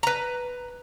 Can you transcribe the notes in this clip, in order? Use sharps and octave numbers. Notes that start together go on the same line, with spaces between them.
B4 A#5